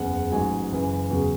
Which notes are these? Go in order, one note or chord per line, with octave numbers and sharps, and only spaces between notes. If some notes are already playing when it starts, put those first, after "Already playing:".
Already playing: F#1 E2 C#3 F#5
A1 G#2 F#3 G#5
F#1 F#2 E3
E2 C#3 F#3